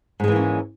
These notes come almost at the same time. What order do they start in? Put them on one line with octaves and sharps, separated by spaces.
G#2 G#3 E3 A#3 C#4